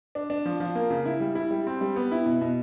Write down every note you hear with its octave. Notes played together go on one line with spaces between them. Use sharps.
D4
D4
F3
F3
A#3
C#3
E4
G3
E4
G3
C4
G3
B3
E4
B2
B2